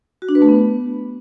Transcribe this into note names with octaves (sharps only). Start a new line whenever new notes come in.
F#4
D4
B4
A3
B3